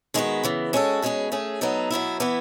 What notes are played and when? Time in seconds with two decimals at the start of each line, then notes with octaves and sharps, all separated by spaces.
0.14 D#3 G#3 B3 F#4 B4
0.43 C#3 E3 B3
0.73 G#3 C#4 F#4 A4
1.02 B2 G#3 C#4 G#4 B4
1.32 A3 C#4 G#4
1.61 F#3 B3 D#4 A4
1.91 B2 F#3 B3 E4
2.20 E3 B3 E4 B4